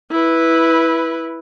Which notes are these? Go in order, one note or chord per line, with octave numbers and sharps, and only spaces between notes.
E4 B4